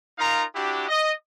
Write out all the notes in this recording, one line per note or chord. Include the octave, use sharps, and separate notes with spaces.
D#4 F4 A#4 F5 A#5
D4 E4 F#4 G4
D#5